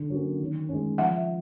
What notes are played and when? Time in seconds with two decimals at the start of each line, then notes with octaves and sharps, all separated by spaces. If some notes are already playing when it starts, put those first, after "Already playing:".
Already playing: D3
0.10 F#3 A#3 C#4
0.40 D#3
0.69 G#3 C#4
0.98 F3 E5 F#5